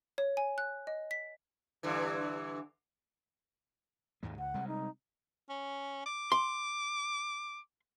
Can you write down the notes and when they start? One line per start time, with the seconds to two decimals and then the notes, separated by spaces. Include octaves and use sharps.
0.18 C#5
0.37 G#5
0.58 F#6
0.87 D#5
1.11 B6
1.83 G2 D3 E3
4.23 D#2 G#2 G#3
4.38 C#2 F#5
4.54 C3 G3 G#3
4.67 D#4
5.49 C#4
6.06 D6
6.32 C6